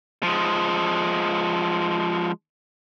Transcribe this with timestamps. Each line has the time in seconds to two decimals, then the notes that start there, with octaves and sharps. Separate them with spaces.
0.23 F3 G#3